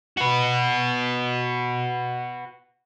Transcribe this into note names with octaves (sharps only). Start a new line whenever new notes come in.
F#4 B4